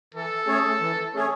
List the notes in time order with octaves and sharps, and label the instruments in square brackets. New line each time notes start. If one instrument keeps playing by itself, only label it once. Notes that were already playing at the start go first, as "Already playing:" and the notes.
[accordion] E3 [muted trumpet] A4
[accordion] A3 C#4 G#4 C#5
E3
A3 C#4 G#4 C#5